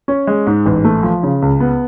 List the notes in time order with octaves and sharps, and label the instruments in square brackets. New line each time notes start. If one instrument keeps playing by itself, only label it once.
[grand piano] C#4
G#3
G#2
A1
A3
F3
C#3
C#2
B3